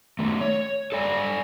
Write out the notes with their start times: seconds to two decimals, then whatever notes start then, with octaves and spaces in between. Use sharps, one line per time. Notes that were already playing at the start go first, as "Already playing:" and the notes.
0.19 D#3 A3
0.41 C#5
0.92 A4 D5 G#5